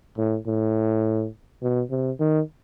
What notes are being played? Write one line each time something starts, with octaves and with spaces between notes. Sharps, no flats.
A2
A2
B2
C3
D#3